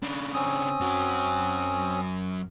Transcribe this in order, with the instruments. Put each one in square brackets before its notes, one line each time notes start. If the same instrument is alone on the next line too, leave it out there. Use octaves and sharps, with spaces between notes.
[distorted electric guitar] C#3 D4
[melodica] C4 C#4 D#6
[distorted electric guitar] F#2 F#4